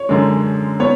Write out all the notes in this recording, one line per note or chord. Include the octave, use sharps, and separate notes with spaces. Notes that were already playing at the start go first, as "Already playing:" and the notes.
Already playing: C#5
F#2 D3 G#3
B3 C#5